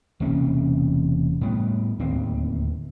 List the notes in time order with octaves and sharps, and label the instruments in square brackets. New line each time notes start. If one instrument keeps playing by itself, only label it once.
[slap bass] E1 C3 A#3 C#4
A2 G3 G#3 B3
D1 D#2 C4